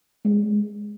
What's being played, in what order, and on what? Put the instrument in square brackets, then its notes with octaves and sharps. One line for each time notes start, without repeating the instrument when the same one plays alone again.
[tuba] G#3